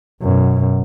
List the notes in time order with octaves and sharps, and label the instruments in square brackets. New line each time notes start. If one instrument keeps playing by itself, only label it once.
[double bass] F#2 B2